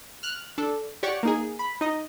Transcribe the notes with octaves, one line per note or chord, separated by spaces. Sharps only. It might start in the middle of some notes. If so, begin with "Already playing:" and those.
F6 F#6
D4 A4
G4 C#5 D5 F#5 C#6
A#3 D#4 G#4
B5
D#4 D#5